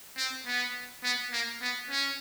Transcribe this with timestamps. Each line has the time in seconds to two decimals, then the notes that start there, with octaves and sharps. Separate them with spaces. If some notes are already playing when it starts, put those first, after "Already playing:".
0.17 C4
0.47 B3
1.03 B3
1.32 A#3
1.61 B3
1.90 C#4